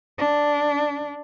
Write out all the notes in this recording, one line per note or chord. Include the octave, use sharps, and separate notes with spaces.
D4